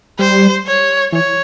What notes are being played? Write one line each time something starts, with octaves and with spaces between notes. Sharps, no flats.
G3 C5
C#5
E3 C#5